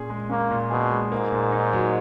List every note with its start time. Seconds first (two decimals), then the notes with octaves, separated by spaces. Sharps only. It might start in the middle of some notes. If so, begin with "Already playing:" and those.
Already playing: A#2 C#4 G#4
0.10 G#3
0.30 A#3 C#4
0.51 A#2
0.70 B2 G#4
0.91 G#3
1.12 G#2 A#3
1.32 A#2
1.53 D#4
1.73 F#3